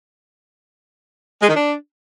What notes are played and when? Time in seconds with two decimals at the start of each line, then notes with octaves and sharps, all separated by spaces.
1.42 G#3
1.49 D#3
1.56 D4